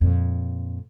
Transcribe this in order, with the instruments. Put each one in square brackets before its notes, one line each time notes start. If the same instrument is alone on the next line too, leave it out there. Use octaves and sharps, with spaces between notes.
[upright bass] F2 A#2